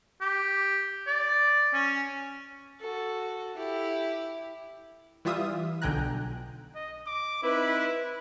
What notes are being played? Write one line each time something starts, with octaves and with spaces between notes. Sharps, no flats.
G4
D5
C#4
F#4 A4
E4 G4
E3 G3 F4 E5 D#6
B1 D3 G5 G#5 A#5 F#6
D#5
D6
C4 D#4 E4 B4